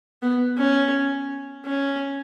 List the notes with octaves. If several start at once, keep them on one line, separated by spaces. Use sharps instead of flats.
B3
C#4
C#4